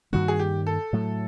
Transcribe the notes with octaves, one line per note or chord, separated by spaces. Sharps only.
G2 D#3 G3 A#3 F#4
G#4
G4
A4
A2 F#3 A3